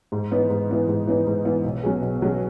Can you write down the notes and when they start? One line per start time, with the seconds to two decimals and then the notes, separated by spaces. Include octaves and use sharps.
0.12 G#2
0.31 E3 B3 D#4
0.50 G#2
0.69 E3 B3 D#4
0.88 G#2
1.07 E3 B3 D#4
1.26 G#2
1.45 E3 B3 D#4
1.64 B1
1.83 B2 F#3 C#4 G#4
2.02 B1
2.22 B2 F#3 C#4 G#4